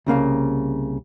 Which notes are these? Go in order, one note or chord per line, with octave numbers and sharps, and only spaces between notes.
C2 C#3 A#3 F5